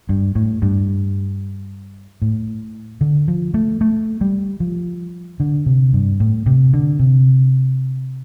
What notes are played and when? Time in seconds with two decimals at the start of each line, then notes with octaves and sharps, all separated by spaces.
0.09 G2
0.36 A2
0.62 G2
2.22 A2
3.01 D3
3.28 F3
3.54 A3
3.81 A3
4.21 G3
4.60 F3
5.40 D3
5.66 C3
5.93 G2
6.20 A2
6.46 C3
6.74 D3
6.99 C3